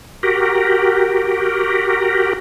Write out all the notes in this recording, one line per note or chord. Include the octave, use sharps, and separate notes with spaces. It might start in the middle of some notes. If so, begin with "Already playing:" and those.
F#4 G4 A#4